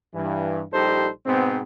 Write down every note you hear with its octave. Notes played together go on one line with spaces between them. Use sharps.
G2 E3
A#1 G3 D#4 G4 A4 C5
G#2 B2 B3 C4